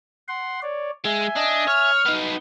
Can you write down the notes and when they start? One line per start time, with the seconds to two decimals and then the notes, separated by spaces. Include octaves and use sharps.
0.28 F#5 C6
0.62 C#5 D5
1.05 G#3 E5 G#5
1.37 D4 D#5
1.68 C#5 F6
2.06 B3 D#4